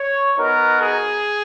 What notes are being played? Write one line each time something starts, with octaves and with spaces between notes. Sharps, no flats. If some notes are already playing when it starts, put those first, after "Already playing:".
Already playing: C#5
B3 D#4 F#4 A#4
G#4